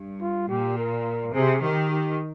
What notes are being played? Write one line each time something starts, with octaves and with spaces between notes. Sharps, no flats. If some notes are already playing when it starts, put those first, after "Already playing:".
Already playing: G2
F4
A#2 G4
A#4
C3 G#4
D#3 G4
G4